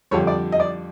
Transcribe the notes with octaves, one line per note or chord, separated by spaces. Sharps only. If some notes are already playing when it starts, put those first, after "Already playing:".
F2 D3 G3 C#5
D5
D#5
D5